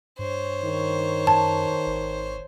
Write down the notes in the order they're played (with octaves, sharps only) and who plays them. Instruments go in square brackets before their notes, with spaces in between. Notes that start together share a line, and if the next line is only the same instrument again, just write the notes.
[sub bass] G2 [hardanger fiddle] C5 C#5
[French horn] D#3
[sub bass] F#2 [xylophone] A5
[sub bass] G#1